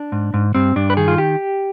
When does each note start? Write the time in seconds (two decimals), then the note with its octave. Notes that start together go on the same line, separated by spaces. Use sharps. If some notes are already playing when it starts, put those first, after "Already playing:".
Already playing: D4
0.12 G#2
0.34 G#2
0.55 G2 C4
0.76 G2 D4
0.90 B4
0.97 D#3 G#4
1.08 F4
1.18 G4